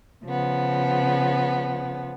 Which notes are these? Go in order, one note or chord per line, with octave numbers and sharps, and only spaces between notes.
C#3 F3 B3